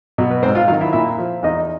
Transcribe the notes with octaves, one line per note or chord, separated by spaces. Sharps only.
B2 F#3
B4
G#2 C4 C5
F4 F5
D#3 F#3 F4 F5
E4 E5
A#2 E4 E5
F3
E2 D#4 D#5